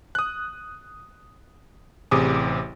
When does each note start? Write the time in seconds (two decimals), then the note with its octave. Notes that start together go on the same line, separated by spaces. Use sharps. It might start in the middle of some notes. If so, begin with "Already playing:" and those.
0.15 D#6 F#6
2.11 A1 C3 G#4 D6 D#6